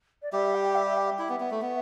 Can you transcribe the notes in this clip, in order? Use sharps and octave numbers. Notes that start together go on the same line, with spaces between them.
D5
G3 G4 E5
G5
E5
E5
G5
E5
E4
B3
B3
A3
B3